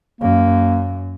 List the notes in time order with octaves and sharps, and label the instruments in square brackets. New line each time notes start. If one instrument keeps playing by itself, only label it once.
[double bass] F#2 [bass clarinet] A#3